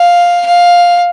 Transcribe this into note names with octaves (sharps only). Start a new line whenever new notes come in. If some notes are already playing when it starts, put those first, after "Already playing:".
Already playing: F5
F5